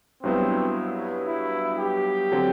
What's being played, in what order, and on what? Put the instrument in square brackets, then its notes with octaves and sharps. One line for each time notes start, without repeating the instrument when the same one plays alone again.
[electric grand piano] G2 F#3 B3 E4 [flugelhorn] C4
[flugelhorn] E4
G4
[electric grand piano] D3 F#3 C4